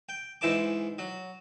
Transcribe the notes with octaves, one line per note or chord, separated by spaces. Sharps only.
G5
G#2 E3 E4 C5 A5 D6
F#3